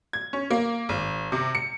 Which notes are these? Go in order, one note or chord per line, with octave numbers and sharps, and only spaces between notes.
G#6
C#4
A#3
G#1
C3
C#7